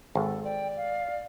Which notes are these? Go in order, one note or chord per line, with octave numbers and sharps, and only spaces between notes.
G#1 A4
D5 G5
F5